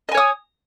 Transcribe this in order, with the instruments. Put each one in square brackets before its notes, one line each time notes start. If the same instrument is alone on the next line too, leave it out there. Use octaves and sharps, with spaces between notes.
[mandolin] D#5
G#5
C#5
D#6